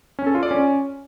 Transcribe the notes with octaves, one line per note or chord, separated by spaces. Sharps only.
C#4
A4
F4
D5
C#4